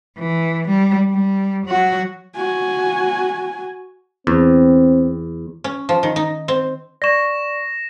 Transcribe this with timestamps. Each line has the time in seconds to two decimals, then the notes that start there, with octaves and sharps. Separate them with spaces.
0.18 E3
0.68 G3
1.11 G3
1.66 F#3 F#4
2.36 F#4 G#5
4.27 E2 C4
5.64 C#4
5.89 F3
6.03 D#3
6.16 D#4
6.48 C4
7.02 D5 C#6 A#6 E7